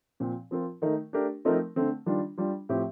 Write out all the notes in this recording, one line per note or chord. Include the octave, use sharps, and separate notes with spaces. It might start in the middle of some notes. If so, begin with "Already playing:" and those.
A#2 F3 C4
F3 C4 F4 A#4
D#3 A3 D#4 A#4
A3 D4 G4 A#4
F3 A3 C4 D#4 A#4
D3 A3 C4
D#3 G3 D4 F4
G3 D4 F4
A2 F3 C4 G4